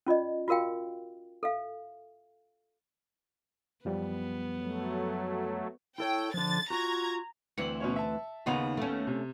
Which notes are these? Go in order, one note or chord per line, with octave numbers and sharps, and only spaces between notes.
C#4 F4 D5 D#5
F4 F#4 A#4 F5 G5
A4 E5 F5
F#2 F3 G3 B3
F#3 A3
E4 A4 C#5 G5
D3 F3 A6
F4 F#4 A#5 G#6
D2 E3 C4 C#7 F#7
B2 C#4 C#5
E5 A5
D#2 C#3 B3 D#4 F4 F7
A3 C#4
C3